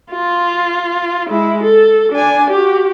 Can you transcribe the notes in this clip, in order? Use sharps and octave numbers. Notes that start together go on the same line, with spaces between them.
F4
G#3 E4
A4
D4 G#5
F#4 G4